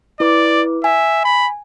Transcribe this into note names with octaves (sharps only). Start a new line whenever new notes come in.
E4 B4 D5 D6
E5 G#5
B5